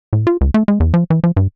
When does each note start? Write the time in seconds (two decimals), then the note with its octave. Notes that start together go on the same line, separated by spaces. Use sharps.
0.13 A2
0.27 F4
0.41 C#2
0.54 A3
0.68 G#3
0.80 E2
0.94 F3
1.10 E3
1.24 F3
1.37 G2